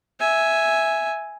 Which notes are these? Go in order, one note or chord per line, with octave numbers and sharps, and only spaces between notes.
E5 G#5